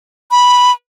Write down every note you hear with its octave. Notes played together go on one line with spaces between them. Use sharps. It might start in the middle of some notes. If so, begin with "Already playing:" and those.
B5